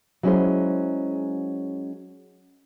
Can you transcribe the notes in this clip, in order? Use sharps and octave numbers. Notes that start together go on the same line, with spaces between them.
F#3 G#3 C#4 E4 G#4 C5